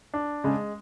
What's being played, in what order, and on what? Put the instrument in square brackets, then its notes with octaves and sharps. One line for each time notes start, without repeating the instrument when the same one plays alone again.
[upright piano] D4
[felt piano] C#3 [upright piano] G#3